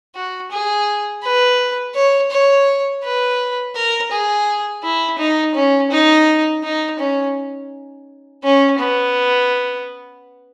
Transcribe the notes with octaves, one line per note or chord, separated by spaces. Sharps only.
F#4
G#4
B4
C#5
C#5
B4
A#4
G#4
E4
D#4
C#4
D#4
D#4
C#4
C#4
B3